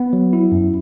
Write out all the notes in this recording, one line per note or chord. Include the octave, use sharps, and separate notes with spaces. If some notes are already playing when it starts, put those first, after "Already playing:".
Already playing: B3
F#3
E4
F#2